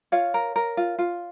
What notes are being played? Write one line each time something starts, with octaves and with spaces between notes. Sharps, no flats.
F4 C#5 F5
A#4
A#4
F4
F4